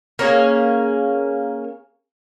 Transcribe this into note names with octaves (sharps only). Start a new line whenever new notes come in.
A#3 C#4 G#4